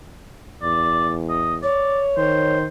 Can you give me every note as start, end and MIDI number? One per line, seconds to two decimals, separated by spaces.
0.63 1.67 40
0.63 1.11 74
1.29 1.55 75
1.63 2.58 73
1.63 2.00 74
2.17 2.66 51
2.17 2.66 72